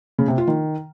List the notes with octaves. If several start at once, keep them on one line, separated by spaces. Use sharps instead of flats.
C#3
C3
F4
D#3